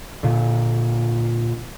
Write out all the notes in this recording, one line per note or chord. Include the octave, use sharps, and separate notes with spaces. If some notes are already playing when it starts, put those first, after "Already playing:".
A#2 D3